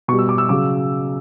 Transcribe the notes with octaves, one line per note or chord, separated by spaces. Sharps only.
B2 G3 C#6
E6
D6
E6
C#3 F#3 D6